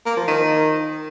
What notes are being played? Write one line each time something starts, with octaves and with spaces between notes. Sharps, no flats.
A#3
F3
D#3